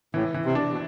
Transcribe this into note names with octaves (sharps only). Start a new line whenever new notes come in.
A2 E3
E3
C3
D4
B2